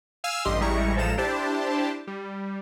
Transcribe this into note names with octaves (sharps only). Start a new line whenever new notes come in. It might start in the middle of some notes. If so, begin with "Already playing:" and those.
F5 G#5 E6 F6
A1 G2 G4 D#5 C6
A1 G3 G#3 E4 A#5 C#6
A1 F3 G#3 A4 A#5 E7
D4 E4 G4 C5 A5
G3